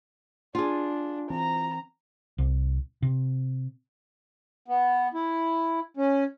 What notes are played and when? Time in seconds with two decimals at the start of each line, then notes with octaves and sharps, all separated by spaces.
0.55 D4 F4 G#4
1.30 E3 C4 A#5
2.38 C2
3.02 C3
4.68 B3
5.14 E4
5.97 C#4